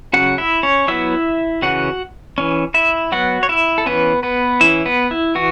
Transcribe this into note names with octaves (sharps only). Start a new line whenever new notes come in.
C#3 F#3 C#4 F#4 F#5
E4 E5
C#4 C#5
F#3 B3 E4 E5
C#3 E3 C#4 F#4 F#5
E3 C#4
E4 E5
F#3 B3 F#4 F#5
C#5
E4 E5
A4
E3 B3 C#4 B4
B3 B4
E3 C#4 E4 E5
B3 B4
E4
E3 F#4